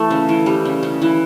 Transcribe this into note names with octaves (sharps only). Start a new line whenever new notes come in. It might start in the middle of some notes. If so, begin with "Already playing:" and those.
Already playing: E3 A3
C#3
E3
G3
C#3
C#3
E3